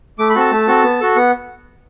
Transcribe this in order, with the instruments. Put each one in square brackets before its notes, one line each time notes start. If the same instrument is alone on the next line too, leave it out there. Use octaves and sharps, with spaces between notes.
[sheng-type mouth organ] A3 D6
B5
C4 F#4 A4 A5
A3
C4 F#4 A4
B3
F#4 A4
B3 F#5